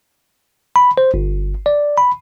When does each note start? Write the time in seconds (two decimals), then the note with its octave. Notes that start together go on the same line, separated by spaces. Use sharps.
0.76 B5
0.98 C5
1.14 G1
1.66 D5
1.97 B5